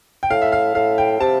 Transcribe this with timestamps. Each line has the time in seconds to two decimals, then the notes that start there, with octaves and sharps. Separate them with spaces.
0.23 G5
0.30 A2 F5
0.42 E5
0.52 F5
0.75 A2 F5
0.98 G5
1.20 C3 A5